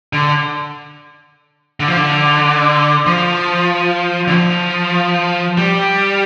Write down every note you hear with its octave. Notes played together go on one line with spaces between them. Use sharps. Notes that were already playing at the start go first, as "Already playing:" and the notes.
D3
D3
F3
D3
F3
D3
F3
G3